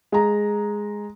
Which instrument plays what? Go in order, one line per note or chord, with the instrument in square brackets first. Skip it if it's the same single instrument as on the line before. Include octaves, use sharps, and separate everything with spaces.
[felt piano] G#3 A#5